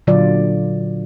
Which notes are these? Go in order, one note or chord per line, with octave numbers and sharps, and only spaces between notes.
A#2 D3 F#3 F4 D5